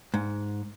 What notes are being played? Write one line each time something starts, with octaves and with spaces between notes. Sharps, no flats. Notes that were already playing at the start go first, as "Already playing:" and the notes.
G#2